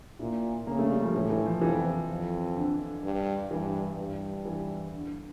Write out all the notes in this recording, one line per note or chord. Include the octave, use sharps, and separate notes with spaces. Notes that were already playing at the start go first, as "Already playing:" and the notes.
A#2 E4
C#3 A#3
A3
G3
F3
A2 E3
E3
F3
F2 E3
F2
D3
G2
G2 E3
G2
E3
D3